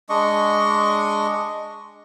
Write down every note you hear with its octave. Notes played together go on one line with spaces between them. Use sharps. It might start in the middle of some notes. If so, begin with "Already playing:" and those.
G#3 D4 D#5 C#6